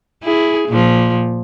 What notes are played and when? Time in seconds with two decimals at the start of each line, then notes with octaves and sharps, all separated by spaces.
0.23 E4 G#4
0.68 A#2 F3